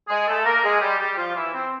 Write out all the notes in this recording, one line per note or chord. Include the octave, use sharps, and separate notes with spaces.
G#3 G#4
A3 A4
A#3 A#4
G#3 G#4
G3 G4
G3 G4
F3 F4
E3 E4
C4